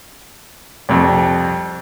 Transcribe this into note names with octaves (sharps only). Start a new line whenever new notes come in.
C2 F2